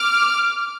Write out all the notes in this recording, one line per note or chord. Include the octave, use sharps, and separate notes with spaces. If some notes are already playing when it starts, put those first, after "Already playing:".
Already playing: D6 F6